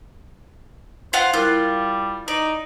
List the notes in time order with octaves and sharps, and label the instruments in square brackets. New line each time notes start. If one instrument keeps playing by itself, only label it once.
[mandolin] F4 F5 F#5 [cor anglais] C5
[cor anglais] G3 [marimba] E4 A#4 F#6 [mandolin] F4
[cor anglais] D#4 [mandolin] D5